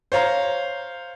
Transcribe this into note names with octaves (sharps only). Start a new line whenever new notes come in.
C5 C#5 F5 A#5